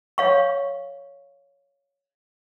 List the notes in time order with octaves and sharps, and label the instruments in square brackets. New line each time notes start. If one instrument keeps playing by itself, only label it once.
[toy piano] C#5 F5 C#6